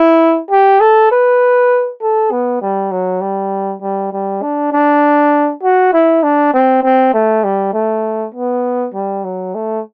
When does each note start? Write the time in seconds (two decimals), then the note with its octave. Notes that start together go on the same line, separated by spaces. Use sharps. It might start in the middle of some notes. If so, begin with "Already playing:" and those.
Already playing: E4
0.51 G4
0.80 A4
1.11 B4
2.02 A4
2.31 B3
2.62 G3
2.91 F#3
3.21 G3
3.82 G3
4.13 G3
4.42 D4
4.72 D4
5.63 F#4
5.93 E4
6.23 D4
6.54 C4
6.83 C4
7.14 A3
7.44 G3
7.74 A3
8.34 B3
8.94 G3
9.24 F#3
9.55 A3